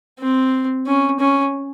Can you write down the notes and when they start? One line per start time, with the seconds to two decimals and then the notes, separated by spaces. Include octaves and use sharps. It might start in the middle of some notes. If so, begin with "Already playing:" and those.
0.20 C4
0.86 C#4
1.19 C#4